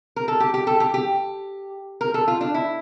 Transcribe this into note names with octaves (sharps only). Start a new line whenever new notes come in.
A#4
A4
G4
G4
A4
G4
G4
A#4
A4
F4
D4
E4